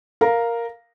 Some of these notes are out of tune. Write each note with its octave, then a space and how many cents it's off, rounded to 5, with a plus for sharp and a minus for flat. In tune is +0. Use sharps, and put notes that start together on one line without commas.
A#4 +0 F5 +0 A#5 +0